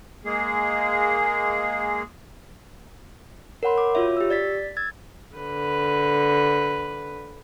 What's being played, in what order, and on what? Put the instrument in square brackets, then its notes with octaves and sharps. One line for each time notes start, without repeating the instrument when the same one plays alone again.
[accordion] G#3 A#3 G#4
[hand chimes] A#4 C#5 F#5 B5 C6
D6
F4 F#4 C#5 E5
G4 E6
D5 A6 B6
E6 G#6 A6
[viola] D3 B4